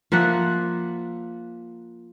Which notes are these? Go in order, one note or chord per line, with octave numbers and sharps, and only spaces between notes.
F3 A#3 E5 F#5